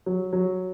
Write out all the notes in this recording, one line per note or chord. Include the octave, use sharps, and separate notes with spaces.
F#3
F#3